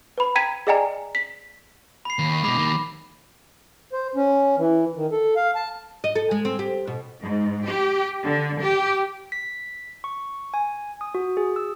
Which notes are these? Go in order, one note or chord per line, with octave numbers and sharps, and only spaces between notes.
B4 B5
G5 A#5 G#6 B6 D#7
G#4 D5 D#5 G5 G#5 A#5
B6
B5 C7
D#2
B2 G#3 B5 D6
D#3 A#3
C5
C#4
E3
D#3
A4
F5
A5
D#5
A4
G#3
C4
G4
B2
G#2
G4
D3
G4
B6
C#6
G#5
D#6
F#4
G#4
E6